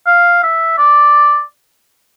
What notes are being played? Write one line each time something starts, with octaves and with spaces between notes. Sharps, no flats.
F5
E5
D5